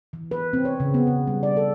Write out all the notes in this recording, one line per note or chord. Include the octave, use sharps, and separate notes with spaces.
E3
B4
C4
C#5
C#3
B3
C#3
G3
D5
A4